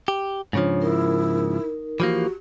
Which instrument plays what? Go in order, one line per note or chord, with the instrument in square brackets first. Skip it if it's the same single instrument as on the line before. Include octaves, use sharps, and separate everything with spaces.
[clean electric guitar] G4
[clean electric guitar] G#2 C#3 F3 [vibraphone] D4 C#5
[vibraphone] D#4 A#4 [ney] E4
[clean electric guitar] E3 F3 A#3 [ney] F#4 [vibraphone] G4